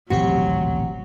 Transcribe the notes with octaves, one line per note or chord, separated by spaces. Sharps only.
D#1 A1 D2 C3 F#3 C4 F#4 G4